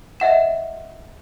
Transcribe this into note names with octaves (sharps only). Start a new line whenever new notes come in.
D#5 E5 F#5 E7